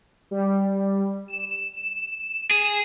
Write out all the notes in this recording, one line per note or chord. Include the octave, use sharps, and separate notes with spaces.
G3
E7
G#4